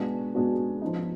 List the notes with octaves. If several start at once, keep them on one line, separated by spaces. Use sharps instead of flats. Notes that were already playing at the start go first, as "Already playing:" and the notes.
Already playing: B2 G#3 B3 D4 F#4
B2 G#3 B3 D4 F#4
F3 B3 D#4